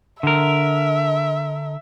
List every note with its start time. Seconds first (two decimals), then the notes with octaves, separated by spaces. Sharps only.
0.23 D3 A#4 E5